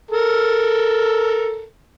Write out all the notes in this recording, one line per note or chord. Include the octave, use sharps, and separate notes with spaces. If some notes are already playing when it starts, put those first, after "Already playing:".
A4 A#4